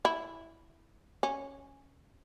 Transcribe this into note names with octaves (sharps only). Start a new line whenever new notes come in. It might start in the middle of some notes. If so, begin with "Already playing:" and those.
E4
C#4